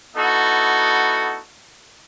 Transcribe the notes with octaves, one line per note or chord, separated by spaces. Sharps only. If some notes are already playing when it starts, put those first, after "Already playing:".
B3 D#4 E4 F#4 A4